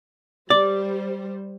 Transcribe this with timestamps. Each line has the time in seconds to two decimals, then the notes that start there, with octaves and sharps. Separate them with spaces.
0.50 G3 C5 D5